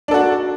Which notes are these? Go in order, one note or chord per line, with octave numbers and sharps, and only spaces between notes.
D4 F#4 A4